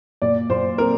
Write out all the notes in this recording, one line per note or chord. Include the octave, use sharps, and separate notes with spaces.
A#2 D5
A#2 C5
C4 A#4